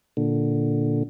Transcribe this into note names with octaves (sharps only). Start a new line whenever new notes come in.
A#2 D3